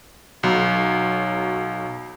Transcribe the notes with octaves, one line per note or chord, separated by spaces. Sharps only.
B1 F#3